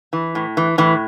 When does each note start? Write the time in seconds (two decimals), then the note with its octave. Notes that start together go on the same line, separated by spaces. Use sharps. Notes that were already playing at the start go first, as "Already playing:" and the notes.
0.13 E3
0.35 A2
0.57 E3
0.78 A2 E3